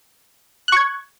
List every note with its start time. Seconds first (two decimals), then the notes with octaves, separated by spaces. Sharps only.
0.68 F#6
0.72 C#6
0.77 G#6